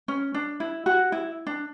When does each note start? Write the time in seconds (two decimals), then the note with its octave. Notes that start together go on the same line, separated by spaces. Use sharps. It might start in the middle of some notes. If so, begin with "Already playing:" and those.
0.08 C#4
0.34 D4
0.60 E4
0.86 F#4
1.12 E4
1.47 D4